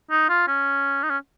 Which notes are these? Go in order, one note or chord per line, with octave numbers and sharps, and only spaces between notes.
D#4
F4
C#4
D#4
C#4